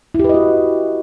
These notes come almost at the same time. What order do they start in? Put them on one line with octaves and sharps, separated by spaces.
E4 G4 B4 D#5 F#4